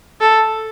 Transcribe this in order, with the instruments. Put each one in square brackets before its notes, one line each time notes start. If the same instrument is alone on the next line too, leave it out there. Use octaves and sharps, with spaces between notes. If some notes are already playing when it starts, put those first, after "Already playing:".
[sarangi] A4